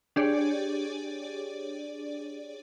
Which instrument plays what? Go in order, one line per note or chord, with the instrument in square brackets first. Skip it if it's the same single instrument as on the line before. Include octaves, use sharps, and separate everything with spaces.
[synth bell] D4 G4 G#4 C#5 D5